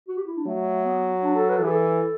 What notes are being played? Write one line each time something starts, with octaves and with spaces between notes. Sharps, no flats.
F#4
G4
E4
D4
F#3 A3
B3
D4
A4
B4
A4
E3 G4
A4